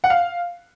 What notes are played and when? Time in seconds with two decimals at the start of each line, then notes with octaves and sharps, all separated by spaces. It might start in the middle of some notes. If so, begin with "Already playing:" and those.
0.04 F#5
0.10 F5